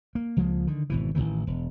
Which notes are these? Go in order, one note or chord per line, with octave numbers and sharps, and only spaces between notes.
A#3
C#2 F3 G#3 A#3
D3 D#3
G#1 B2 E3
A1 A#2 D#3 E3
E1